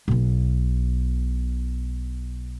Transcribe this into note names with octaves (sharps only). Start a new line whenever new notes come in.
B1 B2